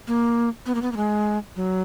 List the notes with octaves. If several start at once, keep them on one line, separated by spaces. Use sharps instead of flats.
A#3
B3
A#3
B3
A#3
G#3
F#3